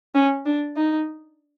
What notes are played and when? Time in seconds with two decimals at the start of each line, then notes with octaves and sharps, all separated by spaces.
0.15 C#4
0.46 D4
0.77 D#4